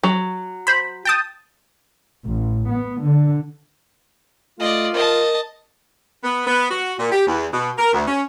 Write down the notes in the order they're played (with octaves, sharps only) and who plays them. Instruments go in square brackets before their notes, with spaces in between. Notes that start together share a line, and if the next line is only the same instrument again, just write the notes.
[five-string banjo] F#3
[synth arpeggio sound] C5 B5
G5 A5 D#6
[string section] A1
B3
D3
[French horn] A3 [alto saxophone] F4 [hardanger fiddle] D5 D#5
[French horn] A#4 [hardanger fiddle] D#5 A5
[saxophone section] B3
B3
F#4
A#2
G4
E2
B2
A#4
D2
C#4